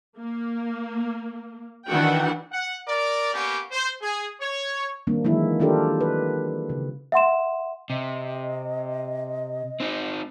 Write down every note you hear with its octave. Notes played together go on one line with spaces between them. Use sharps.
A#3
D#3 E3 D4 F#4 F#5 G5
F#5
A#4 D5
A#3 B3 C#4 G4
C5
G#4
C#5
D#3 G3 A#3 C4 D4
D#3 E3 F#3 G#3 A#3 E4
D#3 D4 F4 G4 A4 A#4
B4
C#3
E5 F#5 C6 E7
C3 D#5
C4 D#4